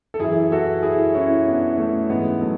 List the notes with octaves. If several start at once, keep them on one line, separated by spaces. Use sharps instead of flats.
A4
F#2 E3 E4 G#4
F#4 A4
E4 G#4
C#4 E4
B3 D4
A3 C#4
G#2 E3 G#3 B3
F#3 A3